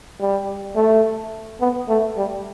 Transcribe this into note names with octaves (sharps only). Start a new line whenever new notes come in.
G3
A3
B3
A3
G3